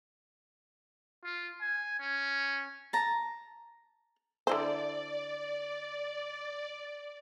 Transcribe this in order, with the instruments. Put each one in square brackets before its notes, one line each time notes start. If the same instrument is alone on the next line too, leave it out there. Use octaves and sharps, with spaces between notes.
[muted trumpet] F4
G#5
C#4
[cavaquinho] A5 A#5
[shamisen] D3 E4 C5 [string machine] D5